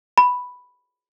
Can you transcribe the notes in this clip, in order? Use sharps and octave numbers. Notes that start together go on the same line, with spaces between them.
B5